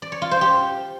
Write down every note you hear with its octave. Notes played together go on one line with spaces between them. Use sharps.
D5
C#5
F4
C5
G4